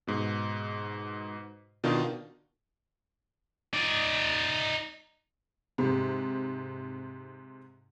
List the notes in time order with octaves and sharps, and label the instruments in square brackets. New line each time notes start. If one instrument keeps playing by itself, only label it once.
[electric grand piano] G#2 B2
B2 D#3 D4 D#4 F4
[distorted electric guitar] D#4 D5
[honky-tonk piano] G#2 C3